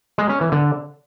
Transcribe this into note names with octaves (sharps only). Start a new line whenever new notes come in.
G#3
C#4
E3
D3